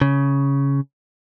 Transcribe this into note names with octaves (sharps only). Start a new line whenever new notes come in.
C#3